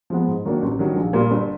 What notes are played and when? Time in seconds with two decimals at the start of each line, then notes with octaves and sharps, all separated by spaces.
0.10 F3 G#3 B3
0.27 G#2
0.45 D#3 F#3 A#3 D4
0.62 A1
0.79 G2 D#3 F#3
0.96 A#1
1.13 A#2 G3 A#3
1.31 G1